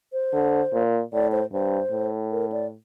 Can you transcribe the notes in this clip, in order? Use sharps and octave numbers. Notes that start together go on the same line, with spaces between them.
C5
D3
A#2
A2 D5
C5
G2 C5
A2
A#4
D5